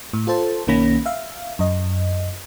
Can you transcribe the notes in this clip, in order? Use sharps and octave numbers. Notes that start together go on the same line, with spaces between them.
A2
F4 A4 C5 A5
B1 D#3 A#3 C#4 B5 A#6
E5 F5
F#2 D#5